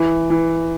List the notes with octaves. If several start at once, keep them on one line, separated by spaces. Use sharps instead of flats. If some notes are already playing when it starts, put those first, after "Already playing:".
Already playing: E3
E3